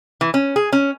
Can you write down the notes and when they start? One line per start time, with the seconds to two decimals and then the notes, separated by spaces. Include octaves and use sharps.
0.21 E3
0.34 C#4
0.56 G#4
0.73 C#4